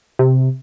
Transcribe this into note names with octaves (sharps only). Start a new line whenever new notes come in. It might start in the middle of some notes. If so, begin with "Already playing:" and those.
C3